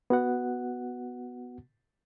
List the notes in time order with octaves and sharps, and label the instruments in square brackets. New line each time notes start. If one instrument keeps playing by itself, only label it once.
[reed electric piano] B3 F#4 F#5